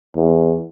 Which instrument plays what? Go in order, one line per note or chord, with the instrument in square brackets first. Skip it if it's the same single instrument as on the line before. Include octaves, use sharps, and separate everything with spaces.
[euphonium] E2